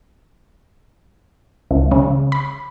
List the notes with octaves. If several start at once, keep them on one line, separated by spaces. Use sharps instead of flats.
C#2
C#3
B5